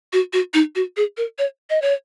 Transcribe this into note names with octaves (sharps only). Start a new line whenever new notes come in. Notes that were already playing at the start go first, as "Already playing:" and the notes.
F#4
F#4
D#4
F#4
G#4
A#4
C#5
D#5
C#5